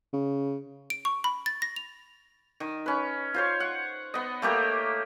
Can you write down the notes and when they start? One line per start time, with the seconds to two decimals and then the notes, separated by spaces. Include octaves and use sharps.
0.13 C#3
0.90 D7
1.05 C#6
1.24 B5
1.46 A6
1.62 A#6
1.76 F7
2.60 D#3
2.86 C#4 B4
3.34 F4 C5 C#5
3.60 F#5
4.14 B3 D#5
4.42 A3 A#3 G4 A#4